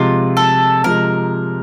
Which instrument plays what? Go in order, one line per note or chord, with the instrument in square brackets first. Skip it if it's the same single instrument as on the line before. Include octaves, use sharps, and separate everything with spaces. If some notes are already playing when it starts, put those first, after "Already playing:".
Already playing: [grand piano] C3 F3 G#3 [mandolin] F4
[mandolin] A4
[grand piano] C3 F3 G#3 [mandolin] A#4